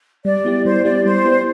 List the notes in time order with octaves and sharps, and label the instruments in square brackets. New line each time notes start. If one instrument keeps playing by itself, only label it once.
[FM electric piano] G3 [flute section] D5
[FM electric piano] B3 E4 G4
[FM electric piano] G3 [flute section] C5
[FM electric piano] B3 E4 G4 [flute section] D5
[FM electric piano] G3 [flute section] C5
[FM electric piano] B3 E4 G4